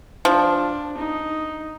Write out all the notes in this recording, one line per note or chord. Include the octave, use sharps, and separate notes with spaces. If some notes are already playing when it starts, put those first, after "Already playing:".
F3 D4
D#4